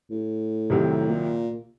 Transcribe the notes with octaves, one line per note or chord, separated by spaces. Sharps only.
A2
C2 C3 D#3 F#3 C4
A#2